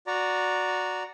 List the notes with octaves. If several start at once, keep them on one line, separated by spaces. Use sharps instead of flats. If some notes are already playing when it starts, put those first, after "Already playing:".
F#4 D5 A#5